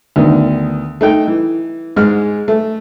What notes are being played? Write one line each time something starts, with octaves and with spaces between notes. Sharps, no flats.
D2 D#3 B3
A3 D#4 G5
E3
G#2 G#3 F6
A3